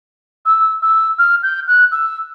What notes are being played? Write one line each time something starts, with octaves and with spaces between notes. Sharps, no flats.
E6
E6
F6
G6
F#6
E6